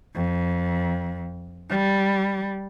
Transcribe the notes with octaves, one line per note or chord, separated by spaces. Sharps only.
F2
G3